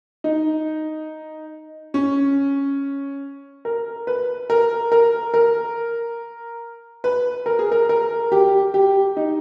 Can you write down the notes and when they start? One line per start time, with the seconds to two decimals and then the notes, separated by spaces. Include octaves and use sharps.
0.24 D#4
1.94 C#4
3.65 A#4
4.07 B4
4.50 A#4
4.92 A#4
5.34 A#4
7.04 B4
7.46 A#4
7.59 G#4
7.72 A#4
7.89 A#4
8.32 G4
8.74 G4
9.17 D#4